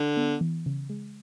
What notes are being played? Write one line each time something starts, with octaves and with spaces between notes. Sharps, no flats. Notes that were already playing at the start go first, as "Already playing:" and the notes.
Already playing: D3
B3
E3
C#3
G#3